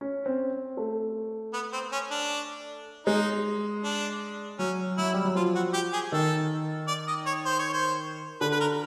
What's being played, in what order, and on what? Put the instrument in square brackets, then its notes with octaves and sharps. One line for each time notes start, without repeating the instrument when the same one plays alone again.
[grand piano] C#4
C4
A3
[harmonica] B3
C4
C#4
D4
[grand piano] G#3 [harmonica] D#4
[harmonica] D4
[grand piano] F#3 [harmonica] C#4
[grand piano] F#3 [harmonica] E4
[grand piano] G3
F#3
[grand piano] F3 [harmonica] F4
[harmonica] F#4
G4
G#4
[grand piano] D#3 [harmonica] A4
[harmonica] D5
D#5
C#5
C5
C#5
C5
[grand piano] D3 [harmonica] B4
[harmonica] B4
A#4